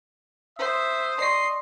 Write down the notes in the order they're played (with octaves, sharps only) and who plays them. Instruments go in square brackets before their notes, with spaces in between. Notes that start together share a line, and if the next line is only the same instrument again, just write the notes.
[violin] C5 [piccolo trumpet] E5 [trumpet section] D#6
[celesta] D5 C6 C#6 [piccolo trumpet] D#5 [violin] C7